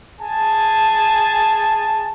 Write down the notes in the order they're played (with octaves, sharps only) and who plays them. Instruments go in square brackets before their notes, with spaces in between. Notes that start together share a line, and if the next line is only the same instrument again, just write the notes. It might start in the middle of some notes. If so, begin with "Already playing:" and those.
[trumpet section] G#4 G#5 A5